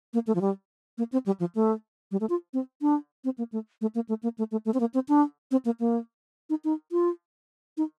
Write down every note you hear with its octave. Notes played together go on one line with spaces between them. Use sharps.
A#3
A3
F3
G3
A#3
C4
G3
F3
A3
G3
A3
F4
C4
D4
C4
A#3
A3
A3
A#3
A3
A#3
A3
A3
A3
C4
A#3
C4
D4
C4
A#3
A#3
D#4
D#4
F4
D#4